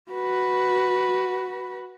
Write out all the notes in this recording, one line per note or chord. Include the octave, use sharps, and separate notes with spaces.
F#4 B4